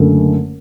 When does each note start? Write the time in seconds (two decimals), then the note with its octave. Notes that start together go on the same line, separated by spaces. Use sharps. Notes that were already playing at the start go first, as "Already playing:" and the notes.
Already playing: F#1 F#2 D3 A3